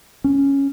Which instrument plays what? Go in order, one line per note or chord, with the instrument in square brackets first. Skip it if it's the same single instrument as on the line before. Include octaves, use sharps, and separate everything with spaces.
[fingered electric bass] C#4